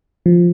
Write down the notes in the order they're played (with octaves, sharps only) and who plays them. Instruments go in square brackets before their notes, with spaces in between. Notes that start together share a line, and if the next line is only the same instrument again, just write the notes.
[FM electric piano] F3